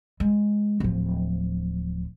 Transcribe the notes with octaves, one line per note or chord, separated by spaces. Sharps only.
G#3
D1 F3